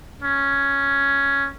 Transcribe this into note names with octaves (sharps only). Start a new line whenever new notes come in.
C#4